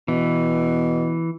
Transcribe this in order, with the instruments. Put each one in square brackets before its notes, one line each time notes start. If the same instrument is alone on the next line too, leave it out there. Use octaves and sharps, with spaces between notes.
[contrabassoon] B2 [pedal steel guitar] E3